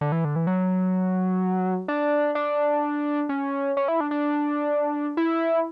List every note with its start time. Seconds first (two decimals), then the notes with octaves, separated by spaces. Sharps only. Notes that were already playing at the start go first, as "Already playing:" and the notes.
0.01 D3
0.12 E3
0.25 D3
0.36 E3
0.47 F#3
1.88 D4
2.35 D4
3.29 C#4
3.77 C#4
3.88 E4
4.00 D4
4.11 D4
5.17 E4